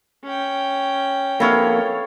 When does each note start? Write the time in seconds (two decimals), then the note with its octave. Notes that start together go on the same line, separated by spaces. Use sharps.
0.24 C#4 G5
1.40 F2 A#3 B3 E4 A4 C#5 F5